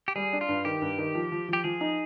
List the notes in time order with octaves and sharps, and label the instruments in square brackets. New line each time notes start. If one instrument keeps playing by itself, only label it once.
[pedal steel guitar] G4
[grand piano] G3 [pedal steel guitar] G#4
[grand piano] D4
[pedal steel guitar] F4
[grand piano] G2
[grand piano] D#3 [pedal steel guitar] G4
[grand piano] G2
D#3
F3
F3
[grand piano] F3 [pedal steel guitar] G4
[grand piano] F3 [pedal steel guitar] G#4
[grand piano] D#4